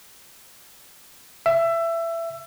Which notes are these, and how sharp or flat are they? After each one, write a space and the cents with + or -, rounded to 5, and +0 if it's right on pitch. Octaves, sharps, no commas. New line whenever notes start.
E5 +20